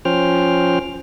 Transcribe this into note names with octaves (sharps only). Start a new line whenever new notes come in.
F3 C#4 C5 G5 F6